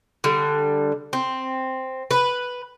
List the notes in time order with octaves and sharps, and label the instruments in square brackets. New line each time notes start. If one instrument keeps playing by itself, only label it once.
[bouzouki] D3 G3
C4
B4